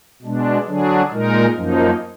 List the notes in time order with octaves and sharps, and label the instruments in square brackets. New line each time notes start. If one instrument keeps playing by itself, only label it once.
[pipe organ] B2 G#3 D4
D3 F#3 D4 G#4
A#2 G#3 D#4 A#4
F#2 F3 A#3 D#4